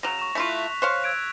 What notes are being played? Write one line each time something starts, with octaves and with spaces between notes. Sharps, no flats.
C#3 F#3 A#6 E7 F7
C#6 E7
A3 E4 F4 B6
F#6
C5 C#5 F5 F#6
E6 G#6 D7